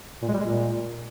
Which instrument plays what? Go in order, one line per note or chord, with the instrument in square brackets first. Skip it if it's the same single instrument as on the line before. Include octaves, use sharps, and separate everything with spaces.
[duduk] A#2
G#3
G3
G#3
A#2